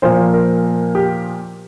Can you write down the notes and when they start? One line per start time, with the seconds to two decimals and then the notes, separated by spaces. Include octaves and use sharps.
0.02 A#2 F3 A#3 C5
0.33 A#4
0.95 G4